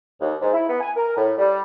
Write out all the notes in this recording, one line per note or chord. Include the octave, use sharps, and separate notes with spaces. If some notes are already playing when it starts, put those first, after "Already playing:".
D#2
G#2
E4
B3
G#5
A#4
A2
G3